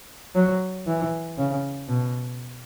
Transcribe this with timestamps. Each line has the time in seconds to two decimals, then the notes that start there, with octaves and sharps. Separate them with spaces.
0.35 F#3
0.87 E3
1.38 C#3
1.89 B2